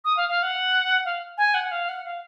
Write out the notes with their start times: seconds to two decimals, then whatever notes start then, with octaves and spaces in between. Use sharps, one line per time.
0.05 D#6
0.17 F5
0.29 F5
0.43 F#5
1.05 F5
1.38 G#5
1.54 F#5
1.71 F5
1.89 F#5
2.04 F5